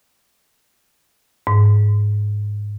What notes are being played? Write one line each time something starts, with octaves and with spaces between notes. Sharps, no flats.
G#2